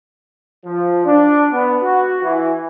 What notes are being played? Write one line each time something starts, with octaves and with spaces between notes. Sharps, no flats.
F3
D4
B3
F#4
E3